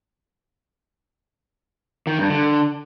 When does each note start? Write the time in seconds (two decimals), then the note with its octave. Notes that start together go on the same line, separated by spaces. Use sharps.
2.07 D#3
2.18 G2
2.30 D3